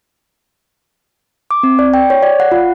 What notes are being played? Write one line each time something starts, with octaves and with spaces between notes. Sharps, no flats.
D6
C4
D5
G5
C#5
D5
F#5
F4